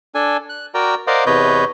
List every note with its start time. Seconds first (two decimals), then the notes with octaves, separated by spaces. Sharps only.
0.15 D4 A4 G#5
0.49 F#6
0.74 F#4 A#4 D5 G5 A#5
1.07 A#4 C5 D5 D#5 F5 F#5
1.26 E2 C3 B4 C#5 D#5 G6